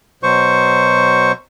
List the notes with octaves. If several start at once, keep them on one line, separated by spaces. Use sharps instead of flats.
B2 F#3 C5 C#6